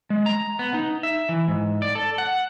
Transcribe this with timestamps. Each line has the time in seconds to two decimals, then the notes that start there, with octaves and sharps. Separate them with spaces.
0.10 G#3
0.26 A#5
0.59 B3
0.74 D#4
1.03 E5
1.29 E3
1.48 G#2
1.82 D5
1.95 A4
2.18 F#5